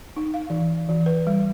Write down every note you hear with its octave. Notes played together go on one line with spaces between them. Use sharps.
D#4
F5
E3
E3
B4
G3